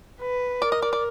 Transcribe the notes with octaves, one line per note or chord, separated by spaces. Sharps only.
B4
A#4 D5
D#5
D5
D5